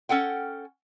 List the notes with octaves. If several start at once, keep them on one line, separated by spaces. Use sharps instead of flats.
C#4 A4 F#5 G5